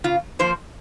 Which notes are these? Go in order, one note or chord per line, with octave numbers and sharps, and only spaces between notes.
C#3 F4
F3 A#3 C5